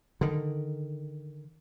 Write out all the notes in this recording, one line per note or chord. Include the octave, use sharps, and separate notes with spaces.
D3 D#3